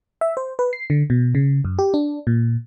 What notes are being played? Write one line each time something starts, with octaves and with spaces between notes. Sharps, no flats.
E5
C5
B4
C7
D3
B2
C#3
F#2
G4
D4
A#2